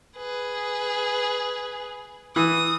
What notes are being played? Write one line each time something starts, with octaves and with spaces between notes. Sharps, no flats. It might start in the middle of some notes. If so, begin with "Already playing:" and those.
G#4 B4
E3 D#6